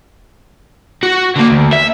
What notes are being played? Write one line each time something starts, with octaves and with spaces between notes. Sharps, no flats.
F#4
D3 A#3
D2
E5